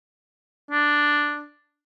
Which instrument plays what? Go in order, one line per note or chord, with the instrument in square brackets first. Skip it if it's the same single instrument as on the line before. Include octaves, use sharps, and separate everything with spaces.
[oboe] D4